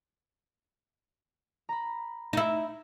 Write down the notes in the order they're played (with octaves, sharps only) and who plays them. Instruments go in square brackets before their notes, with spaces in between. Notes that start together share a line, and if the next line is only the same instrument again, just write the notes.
[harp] A#5 B5
[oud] D#4 E4